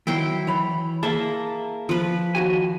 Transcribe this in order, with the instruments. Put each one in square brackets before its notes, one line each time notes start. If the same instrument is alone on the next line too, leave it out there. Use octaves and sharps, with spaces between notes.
[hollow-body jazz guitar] D#3 F#3 [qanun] E4 G5 C6
[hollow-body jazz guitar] E3 C#5 B5
[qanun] A#3 [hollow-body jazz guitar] G#4 E5 A5
[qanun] F3 B4
[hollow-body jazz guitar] D#2 F#4 G#5